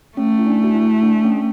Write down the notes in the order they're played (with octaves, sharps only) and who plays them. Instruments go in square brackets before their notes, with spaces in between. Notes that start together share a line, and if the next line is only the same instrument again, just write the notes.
[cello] A3 [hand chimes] C#4
[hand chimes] E4
D4
F#4
E4
D4
C#4